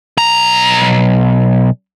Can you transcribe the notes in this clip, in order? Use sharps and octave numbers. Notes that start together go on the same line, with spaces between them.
B1 A#5